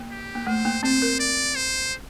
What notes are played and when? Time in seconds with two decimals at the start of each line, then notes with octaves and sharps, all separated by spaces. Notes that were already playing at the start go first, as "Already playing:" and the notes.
Already playing: A#3
0.11 G4
0.35 A#3
0.47 A3 C5
0.65 A#3
0.83 C4 C5
1.02 A#4
1.20 D5
1.56 C5